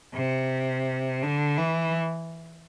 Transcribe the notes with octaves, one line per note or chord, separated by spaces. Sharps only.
C3
D3
E3